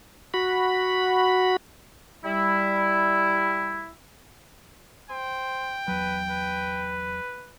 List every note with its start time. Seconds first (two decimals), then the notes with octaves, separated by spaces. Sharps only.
0.34 F#4 B5
2.24 G3 E4
5.10 C5 G5
5.88 E2 F#3 B4
6.30 B4